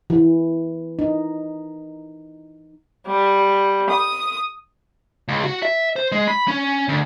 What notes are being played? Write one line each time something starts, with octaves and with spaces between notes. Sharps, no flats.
E3
D#4
G3
D#6
C#2
F#4
E5
C5
G#3
B5
C#4
D2